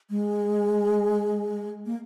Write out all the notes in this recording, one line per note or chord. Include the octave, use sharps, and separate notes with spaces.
G#3
A#3